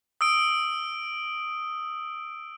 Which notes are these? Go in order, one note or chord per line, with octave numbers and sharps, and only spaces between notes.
D#6 E6 D7